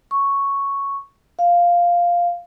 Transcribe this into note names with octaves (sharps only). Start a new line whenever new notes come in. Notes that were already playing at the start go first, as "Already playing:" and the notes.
C#6
F5